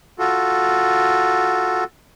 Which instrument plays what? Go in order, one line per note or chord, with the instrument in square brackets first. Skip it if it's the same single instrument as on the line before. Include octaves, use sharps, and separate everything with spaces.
[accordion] F4 F#4 A4